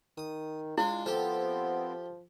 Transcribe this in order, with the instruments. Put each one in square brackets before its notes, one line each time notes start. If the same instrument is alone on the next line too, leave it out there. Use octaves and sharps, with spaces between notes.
[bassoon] D#3 [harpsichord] D#6
[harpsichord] G#3 D4 [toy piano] E4 [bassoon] F4
[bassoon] F3 [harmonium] B3 C4 [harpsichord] G4 A4